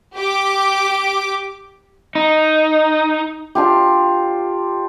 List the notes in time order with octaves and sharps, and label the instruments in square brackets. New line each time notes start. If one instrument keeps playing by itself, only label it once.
[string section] G4 D6
[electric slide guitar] D#4
[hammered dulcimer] D4 F4 G4